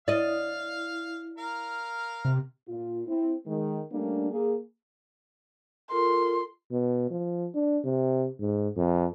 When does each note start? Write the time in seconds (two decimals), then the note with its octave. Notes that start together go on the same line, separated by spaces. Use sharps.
0.08 E4 D5 D#5 F5
1.38 A#4 F5
2.25 C3
2.68 A#2 F4
3.07 C4 E4
3.46 D#3 G#3
3.92 G3 A3 A#3 C#4 D4
4.30 A#3 G#4
5.91 F4 A4 A#4 C6
6.71 B2
7.10 F3
7.55 D4
7.84 C3
8.40 G#2
8.77 F2